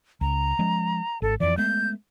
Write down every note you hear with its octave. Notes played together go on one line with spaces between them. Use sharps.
C#2 A#5
F3 G#3 C#4
G#1 A4
F2 E3 D5
G#3 A3 B3 G6